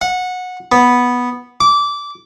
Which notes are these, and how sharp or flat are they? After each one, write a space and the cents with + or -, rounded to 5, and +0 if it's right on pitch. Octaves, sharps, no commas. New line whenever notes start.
F#5 -20
B3 -5
D6 -20